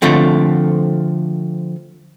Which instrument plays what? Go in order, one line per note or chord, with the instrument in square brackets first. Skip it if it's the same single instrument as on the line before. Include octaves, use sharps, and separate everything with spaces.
[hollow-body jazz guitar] D3 F3 A3 C4